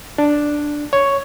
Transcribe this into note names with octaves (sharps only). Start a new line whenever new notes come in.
D4
C#5